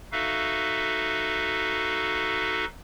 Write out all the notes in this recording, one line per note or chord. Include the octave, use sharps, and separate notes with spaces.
D#4 F#4 A4 B4 E5 F5